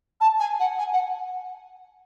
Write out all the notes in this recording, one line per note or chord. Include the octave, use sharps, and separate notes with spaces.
A5
G#5
F#5
G#5
F#5